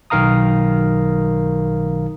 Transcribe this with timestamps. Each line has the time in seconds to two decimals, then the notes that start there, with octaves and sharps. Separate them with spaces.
0.10 B1 D#3 A#4 F5 A#5 D#6